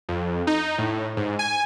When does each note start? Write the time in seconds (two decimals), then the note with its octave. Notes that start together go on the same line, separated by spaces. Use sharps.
0.09 F2
0.47 D#4
0.78 A2
1.17 G#2
1.39 G#5